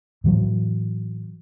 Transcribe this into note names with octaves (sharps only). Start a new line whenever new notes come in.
A2 E3 F#3